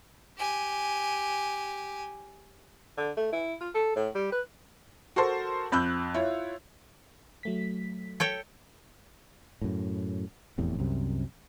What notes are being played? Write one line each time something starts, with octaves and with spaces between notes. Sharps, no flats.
G4 G#5
D3
A3
E4
F4
A4
A2
G3
B4
F#4 A4 A#4 C5 A5
F2 B5 E6 F#6 G6
E4 F4 C#5
F#3 A3 B6
A4 C#5 G5
F#2 A2
F1 E2 A2 C3
C2 F#2 C3